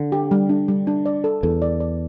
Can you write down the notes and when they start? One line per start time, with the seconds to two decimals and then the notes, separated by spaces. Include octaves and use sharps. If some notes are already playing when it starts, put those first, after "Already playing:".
Already playing: D3
0.12 G4
0.31 G3
0.49 D4
0.68 G3
0.87 D4
1.06 D5
1.24 A4
1.43 E2 A4
1.62 D5
1.80 D5